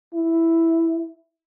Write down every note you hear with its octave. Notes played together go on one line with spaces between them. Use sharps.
E4